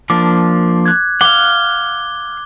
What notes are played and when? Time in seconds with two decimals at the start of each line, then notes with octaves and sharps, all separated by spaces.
0.10 F3 A#3 D4 D6
0.86 F#6 G#6
1.21 F5 F#5 D6 G7